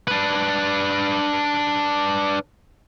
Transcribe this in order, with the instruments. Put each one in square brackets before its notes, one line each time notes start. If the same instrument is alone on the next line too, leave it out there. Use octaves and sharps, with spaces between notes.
[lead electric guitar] D4 B4